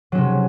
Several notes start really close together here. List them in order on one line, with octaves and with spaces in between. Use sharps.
F#3 C#4 C3